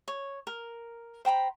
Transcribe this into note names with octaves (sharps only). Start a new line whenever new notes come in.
C#5
A#4
C5 G5 A#5 B5